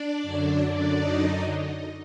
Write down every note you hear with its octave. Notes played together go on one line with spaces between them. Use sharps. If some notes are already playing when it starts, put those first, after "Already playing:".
Already playing: D4 D5
F#2 D3 F#3
D#4 D#5